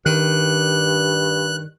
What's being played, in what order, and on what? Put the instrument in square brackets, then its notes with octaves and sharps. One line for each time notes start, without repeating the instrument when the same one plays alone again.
[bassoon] G2 [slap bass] D#3 [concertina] F#6